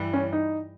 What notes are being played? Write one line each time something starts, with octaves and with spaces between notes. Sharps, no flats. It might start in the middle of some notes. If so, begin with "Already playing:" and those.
Already playing: G2 E3 G3
C#4
D#4